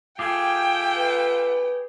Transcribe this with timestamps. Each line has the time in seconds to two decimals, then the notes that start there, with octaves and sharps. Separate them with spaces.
0.19 A3 F4 G4 G#4 G5
0.97 B4